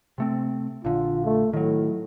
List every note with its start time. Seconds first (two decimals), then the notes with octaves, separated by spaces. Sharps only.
0.18 C3 A3 C4
0.85 A#1 D3 F4
1.25 A3
1.53 A2 D#3 F#3